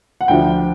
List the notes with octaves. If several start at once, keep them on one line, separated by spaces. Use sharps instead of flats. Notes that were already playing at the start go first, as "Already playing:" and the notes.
F#5
D2 D3 F3 G5